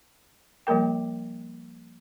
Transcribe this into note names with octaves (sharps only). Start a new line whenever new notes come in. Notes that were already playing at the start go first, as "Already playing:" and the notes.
F3 G3 A#3 A#4 G5